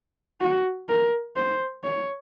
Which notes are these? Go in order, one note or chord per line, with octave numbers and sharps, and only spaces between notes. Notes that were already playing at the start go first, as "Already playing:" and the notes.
F#4
A#4
C5
C#5